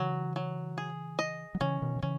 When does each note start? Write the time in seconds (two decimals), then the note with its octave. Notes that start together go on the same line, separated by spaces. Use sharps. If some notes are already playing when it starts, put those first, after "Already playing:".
Already playing: C#3 E3 F#3
0.36 F#3
0.78 G#4
1.19 D#5
1.55 F#3
1.61 C#3 E3 C#4
1.82 B2 D#3
1.96 D#3
2.03 C#3 E3 C#4